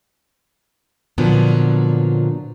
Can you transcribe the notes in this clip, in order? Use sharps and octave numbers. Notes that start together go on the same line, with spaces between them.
A#2 D3 F3 F#3 B3